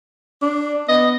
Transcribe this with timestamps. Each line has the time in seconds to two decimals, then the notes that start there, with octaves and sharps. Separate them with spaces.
0.42 D4
0.89 B3 D#5